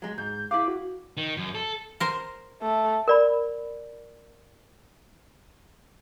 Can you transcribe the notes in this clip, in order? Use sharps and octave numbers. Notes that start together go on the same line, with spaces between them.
F#3 G#3
G#2 G6
E4 G#4 F5 D6
F#4
D#3
F#2
A4
A#4 C5
A3
A#4 D5 B5